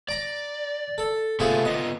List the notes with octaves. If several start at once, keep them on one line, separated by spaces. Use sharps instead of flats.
D5 A#5 D6
A4
C3 A3 B3 F4 G#4 C5
B3 F4 D#5